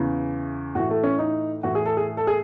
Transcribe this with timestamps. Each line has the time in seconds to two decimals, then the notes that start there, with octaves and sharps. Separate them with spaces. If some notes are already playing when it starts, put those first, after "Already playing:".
Already playing: E2 C#3 E3
0.75 A2 E3 F#4
0.90 A3
1.04 C#4
1.19 D#4
1.63 A2 E3 F#4
1.75 G#4
1.86 A4
1.97 G#4
2.17 A4
2.27 G#4